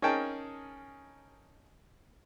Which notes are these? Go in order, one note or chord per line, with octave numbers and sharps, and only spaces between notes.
C#4 D#4 G#4 A#4 G5 A5